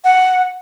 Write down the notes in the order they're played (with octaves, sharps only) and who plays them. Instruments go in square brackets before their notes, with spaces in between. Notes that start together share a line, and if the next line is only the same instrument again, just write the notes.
[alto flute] F#5